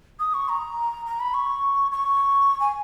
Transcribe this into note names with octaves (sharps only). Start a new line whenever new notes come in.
D#6
C#6
A#5
A#5
B5
C#6
C#6
G#5